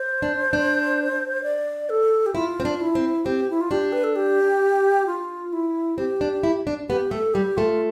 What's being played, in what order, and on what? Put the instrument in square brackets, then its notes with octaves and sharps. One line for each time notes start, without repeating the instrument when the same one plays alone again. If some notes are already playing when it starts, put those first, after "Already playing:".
Already playing: [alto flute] C5
[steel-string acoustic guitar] D4
D4
[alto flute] D5
A4
G4
[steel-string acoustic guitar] E4 [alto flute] F4
[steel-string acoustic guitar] C4
D4
[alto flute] E4
[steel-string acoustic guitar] C4
[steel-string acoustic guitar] C4 [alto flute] G4
[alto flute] E4
F4
[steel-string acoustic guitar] D4 [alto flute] G4
[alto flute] B4
A4
G4
F4
E4
[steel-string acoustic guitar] C4 [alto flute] G4
[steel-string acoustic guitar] D4
E4
D4
[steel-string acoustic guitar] B3 [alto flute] G4
[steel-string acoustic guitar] A3 [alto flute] A4
[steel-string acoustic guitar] G3 [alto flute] G4
[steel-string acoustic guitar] A3 [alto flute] F4